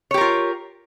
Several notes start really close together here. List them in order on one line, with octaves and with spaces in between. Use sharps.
C#5 G4 A#4 F4